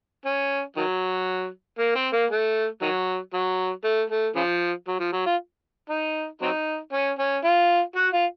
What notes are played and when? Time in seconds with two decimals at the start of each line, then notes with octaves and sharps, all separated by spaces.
0.25 C#4
0.76 D#3 F#3
1.79 A#3
1.96 C4
2.13 A#3
2.30 A3
2.82 D#3 F#3
3.34 F#3
3.84 A3
4.10 A3
4.36 C#3 F3
4.88 F#3
5.00 F3
5.13 F#3
5.26 F4
5.90 D#4
6.42 F#3 C4 D#4
6.93 C#4
7.19 C#4
7.44 F4
7.96 F#4
8.13 F4